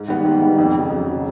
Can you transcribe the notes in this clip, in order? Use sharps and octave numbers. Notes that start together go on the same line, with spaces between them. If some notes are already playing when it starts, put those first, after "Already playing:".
Already playing: G#2
D#3 G3 B3
G#2
D#3 G3 B3
F2
C#3 F#3
F2
C#3 F#3